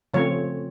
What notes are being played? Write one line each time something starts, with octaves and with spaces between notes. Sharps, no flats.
C#3 F3 A3 C4 C#5